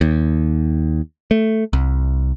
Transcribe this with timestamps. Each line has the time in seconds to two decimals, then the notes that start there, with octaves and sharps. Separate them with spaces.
0.01 D#2
1.31 A3
1.73 C2